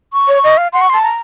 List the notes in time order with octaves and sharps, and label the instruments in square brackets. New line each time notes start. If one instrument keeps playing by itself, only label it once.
[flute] C#6
[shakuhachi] C#5
D#5
F5
[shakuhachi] F#5 [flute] C6
[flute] C#6
[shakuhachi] A5 [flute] C6
[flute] A#5